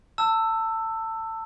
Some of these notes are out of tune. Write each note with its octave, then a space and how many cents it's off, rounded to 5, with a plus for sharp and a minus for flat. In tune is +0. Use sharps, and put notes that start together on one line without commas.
A5 +30 E6 +5